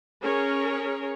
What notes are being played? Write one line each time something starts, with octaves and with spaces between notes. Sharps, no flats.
C#4 G#4 A#4 C#5